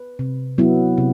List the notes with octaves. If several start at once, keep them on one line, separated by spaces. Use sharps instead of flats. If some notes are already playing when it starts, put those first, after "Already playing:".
Already playing: B4
C3
F#3 B3 E4
C3